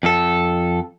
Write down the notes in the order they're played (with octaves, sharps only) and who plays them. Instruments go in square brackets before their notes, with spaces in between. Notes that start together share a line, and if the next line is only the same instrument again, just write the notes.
[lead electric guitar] F2 A4